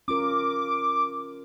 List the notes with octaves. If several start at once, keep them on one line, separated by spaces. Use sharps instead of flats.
C#4 F4 A#4 D6